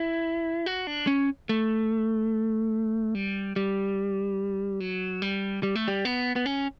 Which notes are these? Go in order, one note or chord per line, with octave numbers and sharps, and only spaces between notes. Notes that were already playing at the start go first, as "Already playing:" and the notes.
Already playing: E4
F#4
D4
C#4
A3
G3
G3
F#3
G3
G3
A3
G3
B3
B3
C#4